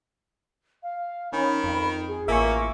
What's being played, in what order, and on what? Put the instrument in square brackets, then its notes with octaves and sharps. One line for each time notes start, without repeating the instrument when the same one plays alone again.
[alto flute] F5
[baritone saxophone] D#3 [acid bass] C#4 [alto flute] B5
[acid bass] F2
[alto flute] G#4
[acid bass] A1 [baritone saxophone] A#3 [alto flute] F4 [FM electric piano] E5 G#5 C#6